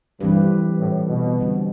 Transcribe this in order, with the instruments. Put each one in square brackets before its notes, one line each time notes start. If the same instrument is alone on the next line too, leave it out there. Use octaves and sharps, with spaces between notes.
[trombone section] G2 [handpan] E3 G3 C4 G4 B4
[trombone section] A2
B2
[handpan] D3 G3 C4